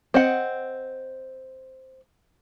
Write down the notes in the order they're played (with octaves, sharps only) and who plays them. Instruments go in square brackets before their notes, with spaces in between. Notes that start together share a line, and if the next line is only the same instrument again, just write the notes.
[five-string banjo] C4 D#5 F#5